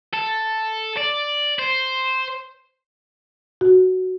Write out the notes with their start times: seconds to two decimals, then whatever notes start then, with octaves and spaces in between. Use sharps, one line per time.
0.13 A4
0.97 D5
1.59 C5
3.61 F#4